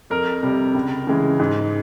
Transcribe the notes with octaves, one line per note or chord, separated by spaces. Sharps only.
F2 A#4
C3 G3
C#2
C#3 E3 G#3
G#2